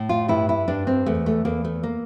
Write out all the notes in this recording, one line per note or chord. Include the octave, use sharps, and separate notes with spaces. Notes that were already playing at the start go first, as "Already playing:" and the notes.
Already playing: A2
F4
G2 E4
E4
G2 D4
C4
E2 A3
A3
E2 A#3
A3
A#3